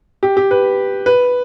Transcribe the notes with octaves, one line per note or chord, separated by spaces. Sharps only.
G4
G4
B4
B4